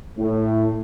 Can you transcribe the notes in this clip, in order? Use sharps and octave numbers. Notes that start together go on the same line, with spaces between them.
A2